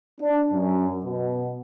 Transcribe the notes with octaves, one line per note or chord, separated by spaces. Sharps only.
D4
F#2
B2